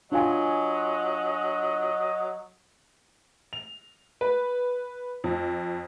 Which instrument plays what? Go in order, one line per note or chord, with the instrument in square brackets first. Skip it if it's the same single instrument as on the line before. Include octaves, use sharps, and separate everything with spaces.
[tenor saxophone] F#3 [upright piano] D4 F4 G#5 [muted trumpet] D#5
[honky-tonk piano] F7
B4
F2